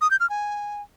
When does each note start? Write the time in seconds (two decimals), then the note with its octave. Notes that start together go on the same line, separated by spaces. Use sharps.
0.01 D#6
0.11 G6
0.20 F6
0.30 G#5